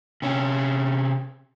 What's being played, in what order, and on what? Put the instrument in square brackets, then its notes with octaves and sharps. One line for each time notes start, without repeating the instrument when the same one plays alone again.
[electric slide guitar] C3 C#4